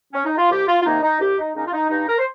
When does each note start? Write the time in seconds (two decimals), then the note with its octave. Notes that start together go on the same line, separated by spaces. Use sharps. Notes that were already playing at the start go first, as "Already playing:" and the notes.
0.13 C#4
0.25 D#4
0.37 F4
0.50 C2 G4
0.67 F4
0.81 F4
0.85 C3 D#3 A#3 D#4
1.02 D#4
1.20 C2 G4
1.38 D#4
1.55 A#2 G#3 C#4 D#4
1.67 F4
1.73 D#4
1.90 G2 D#4
2.08 A#4
2.18 C5